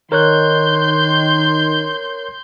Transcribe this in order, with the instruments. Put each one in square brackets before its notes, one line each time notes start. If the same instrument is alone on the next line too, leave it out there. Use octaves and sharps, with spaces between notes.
[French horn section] D#3 [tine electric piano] A#4 C#5 F#6 [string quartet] C6 G6